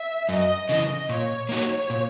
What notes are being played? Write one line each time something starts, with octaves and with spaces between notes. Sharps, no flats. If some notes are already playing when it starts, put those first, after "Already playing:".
Already playing: E5
F#2 D#5
C#3 E3 D#5
A#2 C#5
A#3 D#4 F#4
A#2